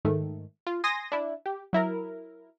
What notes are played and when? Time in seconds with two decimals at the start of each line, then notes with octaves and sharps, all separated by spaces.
0.05 G#2 D#3 A3
0.67 F4
0.84 G#5 C6 D#6 A#6
1.12 D4 E4
1.46 G4
1.73 F#3 E4 A#4